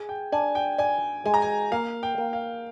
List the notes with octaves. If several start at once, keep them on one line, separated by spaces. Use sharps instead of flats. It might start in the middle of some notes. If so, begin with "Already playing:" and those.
Already playing: G#4 G#5
G5
D4 G#5
G5
D5 G#5
G#3 G#5
A#5
G#5
A#3 F5
G5
A#3
F5